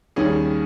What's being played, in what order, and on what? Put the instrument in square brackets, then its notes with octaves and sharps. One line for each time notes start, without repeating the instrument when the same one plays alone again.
[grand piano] D#2 D#3 G3 C#4 G#4